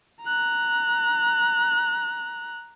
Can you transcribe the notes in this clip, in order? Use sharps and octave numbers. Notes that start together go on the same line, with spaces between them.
A#5 F#6